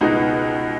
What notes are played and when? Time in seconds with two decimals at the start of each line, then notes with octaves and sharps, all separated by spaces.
0.01 C#2 B2 D#4 F#4